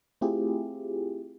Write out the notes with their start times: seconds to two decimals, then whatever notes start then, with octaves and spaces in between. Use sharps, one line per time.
0.21 A3 C4 E4 F4 G4 G#4